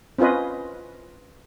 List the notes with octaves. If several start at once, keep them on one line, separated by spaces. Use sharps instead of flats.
C4 C#4 F4 B4 D#5